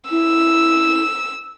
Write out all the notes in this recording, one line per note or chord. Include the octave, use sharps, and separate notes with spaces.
E4 E6